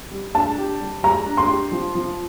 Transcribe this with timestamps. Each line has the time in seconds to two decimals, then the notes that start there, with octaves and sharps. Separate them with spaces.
0.12 G3
0.35 D4 A5
0.58 G4
0.80 G3
1.03 G3 A#5
1.26 D4
1.37 C6
1.49 G4
1.72 F3
1.95 F3